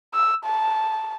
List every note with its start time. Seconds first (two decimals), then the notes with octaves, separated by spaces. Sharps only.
0.14 E6
0.45 A5